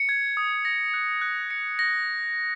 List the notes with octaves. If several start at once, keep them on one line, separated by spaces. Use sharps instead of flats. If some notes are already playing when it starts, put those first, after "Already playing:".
Already playing: C#7
G#6
D#6
A#6
F#6
F#6
C#7
A#6